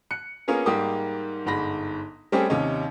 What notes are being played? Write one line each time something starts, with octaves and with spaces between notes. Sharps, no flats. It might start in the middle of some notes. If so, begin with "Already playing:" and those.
F#6 C#7
A#3 B3 C#4 F4 G#4 A#4
G#2 G3 A#3 G4 D#6
G1 G#2 B5 A#6
G3 A3 C4 C#4 G4 G#4
D#2 C3 C#4 D#4